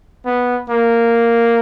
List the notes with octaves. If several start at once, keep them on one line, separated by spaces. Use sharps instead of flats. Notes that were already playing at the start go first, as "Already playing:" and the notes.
B3
A#3